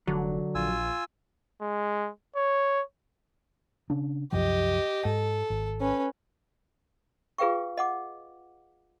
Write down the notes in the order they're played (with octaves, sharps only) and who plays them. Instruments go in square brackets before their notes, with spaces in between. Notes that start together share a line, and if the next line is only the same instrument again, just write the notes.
[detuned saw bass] F1 [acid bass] D3 [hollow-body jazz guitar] F#3
[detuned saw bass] A#1 [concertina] F4 G#5 E6
[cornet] G#3
C#5
[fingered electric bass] C#3 C#4 D4
[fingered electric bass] C2 F#2 F3 [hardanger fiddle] G4 D#5
[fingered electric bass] G#2 [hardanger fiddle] A4
[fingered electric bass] G#1
[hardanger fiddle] C#4 B4
[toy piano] F4 G#4 B4 F5 G5 C#6
D#5 F#5 D6